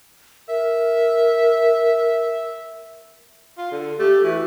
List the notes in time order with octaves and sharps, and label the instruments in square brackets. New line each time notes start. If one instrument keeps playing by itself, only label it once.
[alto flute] A#4 [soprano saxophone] E5
[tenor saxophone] F4
D3
[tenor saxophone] A3 [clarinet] G4
[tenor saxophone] E3 [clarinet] F#4